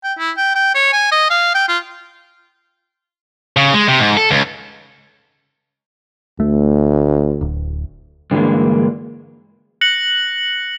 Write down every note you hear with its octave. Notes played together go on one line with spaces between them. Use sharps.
G5
E4
G5
G5
C#5
G#5
D#5
F5
G5
F4
C#3
G#3
C3
G#2
A4
C#2
D2 A3
D1
G2 D3 E3 G#3 A#3 D4
F#6 A#6 C#7 F#7